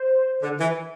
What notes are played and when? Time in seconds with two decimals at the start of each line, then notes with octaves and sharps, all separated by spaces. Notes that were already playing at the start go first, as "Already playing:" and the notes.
Already playing: C5
0.42 D3
0.58 E3